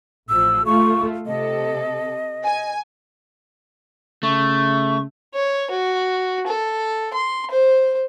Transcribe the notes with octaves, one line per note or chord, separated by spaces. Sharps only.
A1 F3 E6
A3 F4 C#6
C3 A4 D#5
G#5
C#3 A3 C#6
C#5
F#4
A4
C6
C5